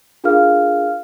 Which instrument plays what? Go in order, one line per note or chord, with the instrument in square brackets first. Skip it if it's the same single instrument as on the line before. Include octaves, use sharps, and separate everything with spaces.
[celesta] D4 F4 G#4 A#4 F5 F6